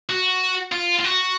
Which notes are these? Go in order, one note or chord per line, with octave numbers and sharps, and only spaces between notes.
F#4
F4
F4
F#4